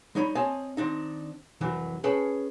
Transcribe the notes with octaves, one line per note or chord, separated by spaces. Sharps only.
G3 D#4 C#5 B5
C4 C#5 D#5 G#5 A5
D#3 C4 D4 D#4
C2 F2 E3 F#3
C#4 G#4 B4 C#5 G5 A5